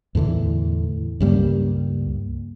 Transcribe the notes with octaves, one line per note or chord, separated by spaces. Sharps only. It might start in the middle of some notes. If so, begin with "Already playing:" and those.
E2 A2 D3 E3
C#2 G2 G3 A#3